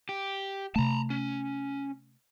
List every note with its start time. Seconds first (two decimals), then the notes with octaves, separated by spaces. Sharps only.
0.09 G4
0.76 C3 A3 A5 A#5
1.10 C#4